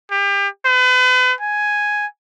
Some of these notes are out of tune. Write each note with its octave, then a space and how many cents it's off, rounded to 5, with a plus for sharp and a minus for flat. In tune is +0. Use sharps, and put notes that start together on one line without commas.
G4 +35
B4 +40
G#5 +5